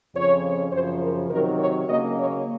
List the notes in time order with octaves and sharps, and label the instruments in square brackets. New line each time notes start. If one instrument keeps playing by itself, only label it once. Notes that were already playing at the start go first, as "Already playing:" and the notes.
[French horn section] F2 C#3 F3 C#5
F#2 C#3 F3 C5
A#4
C3 D#3 F#3 A#4
C#5
C#3 F#3 A#3 C#4 D#5
C#5